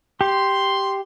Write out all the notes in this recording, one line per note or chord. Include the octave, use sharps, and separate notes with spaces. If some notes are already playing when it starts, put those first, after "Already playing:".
G4 C6